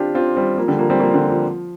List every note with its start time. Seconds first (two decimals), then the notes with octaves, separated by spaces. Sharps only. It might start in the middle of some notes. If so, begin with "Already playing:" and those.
Already playing: C4 D4 F4 G4
0.15 C4 F4
0.36 G3 C4
0.58 F3 A#3
0.68 D3 G3
0.79 F3 A#3
0.90 G3 C4
1.00 F3 A#3
1.14 D3 G3
1.29 F3